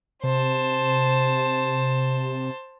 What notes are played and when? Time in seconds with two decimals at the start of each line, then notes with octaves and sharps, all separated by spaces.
0.24 C3 C5 A5